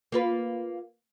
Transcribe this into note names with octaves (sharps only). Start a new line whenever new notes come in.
A#3 F4 B4